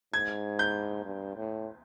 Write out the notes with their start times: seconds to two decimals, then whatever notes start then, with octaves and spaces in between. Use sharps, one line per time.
0.14 G#2 G#6
0.59 G6
1.05 G2
1.36 A2